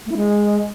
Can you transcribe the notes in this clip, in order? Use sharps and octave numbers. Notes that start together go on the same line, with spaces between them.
A3
E4
G#3